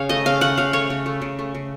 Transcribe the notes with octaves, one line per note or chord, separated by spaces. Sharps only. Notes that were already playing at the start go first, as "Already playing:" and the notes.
Already playing: C#3 C#5 F5
A3 D#5
C#3 F5
A3 F#5
C#3 F5
A3 C#5
C#3
A3
C#3
A3
C#3